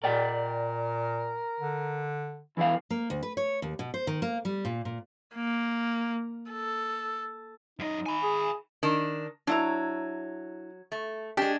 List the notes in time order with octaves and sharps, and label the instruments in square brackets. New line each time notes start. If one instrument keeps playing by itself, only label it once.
[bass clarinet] A#2 [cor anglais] A#4 [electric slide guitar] D5 D#5 G5
[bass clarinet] D3
[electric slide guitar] E2 E3 F5 [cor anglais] E4
[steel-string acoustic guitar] A#3
D2
B4
C#5
D#2
B2
C5
D#3
A#3
G3
A#2
A#2
[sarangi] A#3
A4
[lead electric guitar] F#2 D#5 [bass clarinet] D#4
[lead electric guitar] G#5 B5
[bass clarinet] G#4
[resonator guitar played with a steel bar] D#3 D4
[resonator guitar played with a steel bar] F#3 [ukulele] D4 E4 A#5
[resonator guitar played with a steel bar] A3
[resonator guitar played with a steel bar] G#3 D4 [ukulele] G4